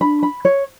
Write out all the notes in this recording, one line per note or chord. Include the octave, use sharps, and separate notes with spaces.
D4 B5
B5
C#5